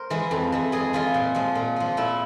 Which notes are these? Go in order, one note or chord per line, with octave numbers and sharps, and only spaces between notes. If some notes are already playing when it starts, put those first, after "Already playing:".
Already playing: A#4 C5
E3 G#3
F2
E3 G#3
F2 G#4
E3 G#3 F4
A#2
F3 G#3
A#2
F3 G#3
A#2 E4